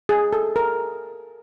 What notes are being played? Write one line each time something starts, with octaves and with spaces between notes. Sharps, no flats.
G#4
A4
A#4